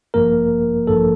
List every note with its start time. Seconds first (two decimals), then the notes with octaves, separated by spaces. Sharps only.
0.14 A1 G2 F3 A#3 A#4
0.87 A1 G2 F3 A#3 A4